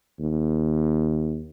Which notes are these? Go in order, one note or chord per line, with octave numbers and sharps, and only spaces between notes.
D#2